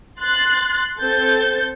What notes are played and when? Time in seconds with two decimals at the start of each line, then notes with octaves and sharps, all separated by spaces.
0.21 C6 F#6 A6
1.00 C4 A4 G6 A6